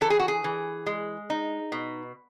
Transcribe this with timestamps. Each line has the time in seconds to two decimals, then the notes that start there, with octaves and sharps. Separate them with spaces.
0.01 E3 A4
0.10 G#4
0.19 F#4
0.28 G#4
0.44 E3
0.86 G#3
1.30 D#4
1.72 B2